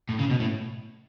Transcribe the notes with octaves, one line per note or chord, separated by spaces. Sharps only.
A2
C#3
B2
A2